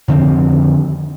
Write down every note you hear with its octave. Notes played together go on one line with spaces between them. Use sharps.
F2 D3 D#3 C4